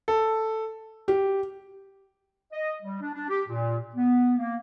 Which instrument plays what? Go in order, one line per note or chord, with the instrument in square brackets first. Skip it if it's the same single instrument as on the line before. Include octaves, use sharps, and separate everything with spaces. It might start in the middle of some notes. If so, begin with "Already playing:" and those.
[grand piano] A4
[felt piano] G4
[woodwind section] D#5
G3
D4
D4
G4
A#2
B3
A#3